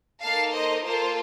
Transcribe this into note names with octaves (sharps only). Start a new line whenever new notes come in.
A#3 D#4 A4 F5 A5
C5 D#5
A#3 F4 A4 C5